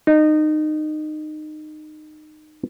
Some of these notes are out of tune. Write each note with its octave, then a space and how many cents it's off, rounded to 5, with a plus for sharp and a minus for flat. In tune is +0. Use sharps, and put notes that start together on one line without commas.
D#4 -25